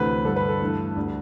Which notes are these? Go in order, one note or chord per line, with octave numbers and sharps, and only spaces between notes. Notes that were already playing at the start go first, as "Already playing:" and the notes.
Already playing: D2 C3 E3 A3 B4
G2 D3 G3 A4
B4
A4
G2 E3 A3
D2 D3 G3